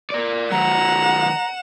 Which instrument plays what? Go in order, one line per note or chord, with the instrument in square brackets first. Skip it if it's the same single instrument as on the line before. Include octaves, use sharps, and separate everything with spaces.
[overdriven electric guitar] A#4 D5
[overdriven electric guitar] D#3 F#3 [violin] F#5 E7 [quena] A#5